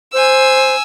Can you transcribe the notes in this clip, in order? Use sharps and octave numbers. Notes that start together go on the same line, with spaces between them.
C5 G#5 E6